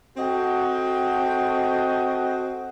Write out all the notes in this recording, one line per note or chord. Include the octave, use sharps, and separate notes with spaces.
C4 F#4 A4 D#5 F#5 G5